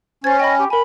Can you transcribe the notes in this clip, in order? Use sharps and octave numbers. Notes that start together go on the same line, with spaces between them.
C#4 C5 G#6 A6
D#5 G5 B5
G4
A#4 G#5 B5